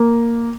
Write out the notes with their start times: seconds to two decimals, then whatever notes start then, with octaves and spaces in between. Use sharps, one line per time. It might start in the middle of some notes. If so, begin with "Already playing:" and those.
Already playing: A#3